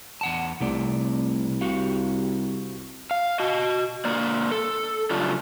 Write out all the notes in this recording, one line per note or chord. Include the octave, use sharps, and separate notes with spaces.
E2 F#5 A5
C2 C3 A3 D5
F#4 G4 F5
F5
F#4 D#5
D3 A#3 D5
A4
C#3 F#3 G3 A3 D4 F4